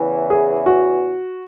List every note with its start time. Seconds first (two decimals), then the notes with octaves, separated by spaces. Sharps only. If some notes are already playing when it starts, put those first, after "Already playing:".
Already playing: E2 C#3 E3
0.30 G#4
0.66 F#4